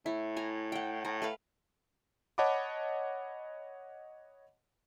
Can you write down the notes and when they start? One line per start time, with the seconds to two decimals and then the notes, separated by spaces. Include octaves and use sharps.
0.06 A2 E4
0.37 G#5 A#5
0.72 F#5 G5
1.05 A2 A#5
1.22 A3 B4 F5
2.38 C#5 D#5 F#5 A5 B5 D6